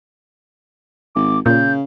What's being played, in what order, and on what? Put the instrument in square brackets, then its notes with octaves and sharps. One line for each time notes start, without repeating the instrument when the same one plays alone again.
[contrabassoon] G#1 [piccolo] D6
[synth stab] A#2 [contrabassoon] C#3 [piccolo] G6